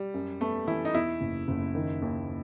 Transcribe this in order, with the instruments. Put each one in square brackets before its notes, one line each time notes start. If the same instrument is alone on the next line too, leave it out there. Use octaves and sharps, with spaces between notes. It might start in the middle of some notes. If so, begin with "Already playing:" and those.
Already playing: [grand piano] G3
[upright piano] F#2
[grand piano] A3 [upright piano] B3
[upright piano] E3 [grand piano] E4
[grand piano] D#4
[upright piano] E2 [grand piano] E4
[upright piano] F#1
F#1
D#3
D#2